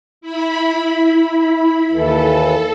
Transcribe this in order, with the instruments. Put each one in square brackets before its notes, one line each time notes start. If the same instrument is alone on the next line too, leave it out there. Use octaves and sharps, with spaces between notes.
[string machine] E4 B5
[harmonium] D#2 E3 [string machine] A4